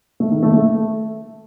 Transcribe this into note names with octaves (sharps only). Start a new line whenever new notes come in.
A3
D#3
A3
A3